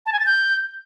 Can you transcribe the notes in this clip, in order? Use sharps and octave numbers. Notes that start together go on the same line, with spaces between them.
A5
G#5
A6
G6